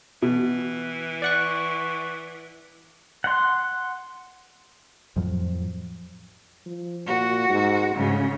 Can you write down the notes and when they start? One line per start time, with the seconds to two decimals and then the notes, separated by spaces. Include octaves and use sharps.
0.22 B2 E3
1.22 D5 F#5 C#6
3.24 F#5 C6
5.16 F2 A2 F3 F#3
6.66 F3
7.07 A#2 F#4
7.49 G#2
7.95 D2 G#2 C#3